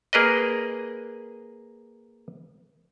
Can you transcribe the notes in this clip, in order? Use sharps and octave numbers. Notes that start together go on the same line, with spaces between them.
A#3 G#4 A#4 B4 D5 D#5